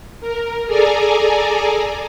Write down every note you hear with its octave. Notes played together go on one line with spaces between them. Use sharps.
A#4
G#4 A4 D5 G#5 A#5